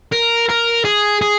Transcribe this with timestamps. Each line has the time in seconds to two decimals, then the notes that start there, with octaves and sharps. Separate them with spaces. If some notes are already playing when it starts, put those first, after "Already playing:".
0.13 A#4
0.49 A#4
0.85 G#4
1.21 G#4